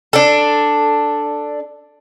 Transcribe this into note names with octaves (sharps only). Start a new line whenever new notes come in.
D4 A4